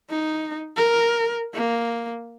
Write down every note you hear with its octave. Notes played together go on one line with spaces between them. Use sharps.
D#4
A#4
A#3